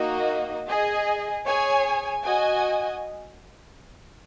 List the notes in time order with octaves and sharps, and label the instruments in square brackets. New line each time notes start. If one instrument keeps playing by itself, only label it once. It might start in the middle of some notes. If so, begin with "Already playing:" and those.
Already playing: [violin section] A#3 D#4 F#4 D#5
G#4 D#5 G#5
G#4 C#5 G#5
F#4 D#5 G#5